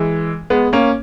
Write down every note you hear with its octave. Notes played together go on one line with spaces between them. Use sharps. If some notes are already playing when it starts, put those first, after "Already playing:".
Already playing: E3 G#3
G#3 B3
A#3 C#4